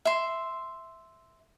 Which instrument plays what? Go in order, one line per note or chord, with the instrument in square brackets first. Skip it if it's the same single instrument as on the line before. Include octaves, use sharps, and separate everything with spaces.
[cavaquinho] E5 C6